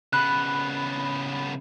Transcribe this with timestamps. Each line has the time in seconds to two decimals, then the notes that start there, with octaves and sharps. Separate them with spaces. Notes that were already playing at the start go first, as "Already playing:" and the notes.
0.13 C#3 B3 B5 F#6